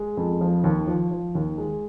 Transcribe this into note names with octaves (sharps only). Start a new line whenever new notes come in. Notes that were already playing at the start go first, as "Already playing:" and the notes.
Already playing: G#3
F2
F3
D#2
F3
F3
D#2
G#3